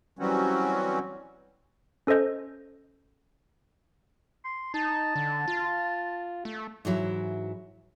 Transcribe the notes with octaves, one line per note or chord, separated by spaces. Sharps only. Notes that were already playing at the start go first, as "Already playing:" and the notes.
E3 F#3 G3 C4 C#4 F#4
C#4 A4 C5 D#5 G6
C6
D#4 A5
D3
F4
A3
G#2 E3 F#3 E4